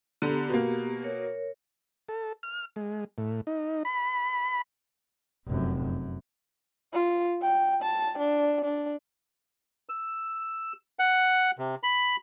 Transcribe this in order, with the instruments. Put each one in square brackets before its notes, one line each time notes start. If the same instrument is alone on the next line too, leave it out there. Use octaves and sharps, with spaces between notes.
[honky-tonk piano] D3 [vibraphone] B3 G4 A#5
[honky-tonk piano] B2 A#3
[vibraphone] A#4 C#5
[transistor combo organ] A4
F6
G#3
A2
D#4
B5
[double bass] F1 F#2
F#2
[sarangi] F4
G5
A5
D4
D4
[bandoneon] E6
F#5
C3
B5